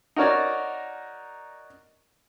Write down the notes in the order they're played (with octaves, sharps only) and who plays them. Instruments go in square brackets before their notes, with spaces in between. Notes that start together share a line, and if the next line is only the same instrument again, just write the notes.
[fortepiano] D#4 F#4 A#4 C#5 D5